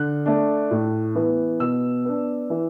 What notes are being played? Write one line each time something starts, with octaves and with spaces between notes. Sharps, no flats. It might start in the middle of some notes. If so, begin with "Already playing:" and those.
Already playing: D3 F#6
A3 D4
A2
E3 B3
B2 E6
B3 D4
E3